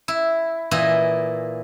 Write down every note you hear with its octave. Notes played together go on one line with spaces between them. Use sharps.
E4
A#2 E3 E4 D#5